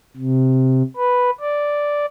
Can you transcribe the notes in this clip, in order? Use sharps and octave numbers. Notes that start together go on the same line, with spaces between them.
C3
B4
D5